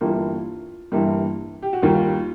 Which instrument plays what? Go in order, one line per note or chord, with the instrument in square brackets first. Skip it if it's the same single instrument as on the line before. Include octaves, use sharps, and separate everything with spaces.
[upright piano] G1 G2 E3 G3 A#3 F4
G1 G2 E3 G3 A#3
G4
F#4
D#2 D#3 G3 A#3 F4